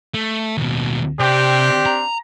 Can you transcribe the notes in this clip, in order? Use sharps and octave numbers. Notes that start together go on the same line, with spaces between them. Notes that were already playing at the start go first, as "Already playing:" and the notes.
A3
D#2 B2
C3 C4 D4 G4
A#5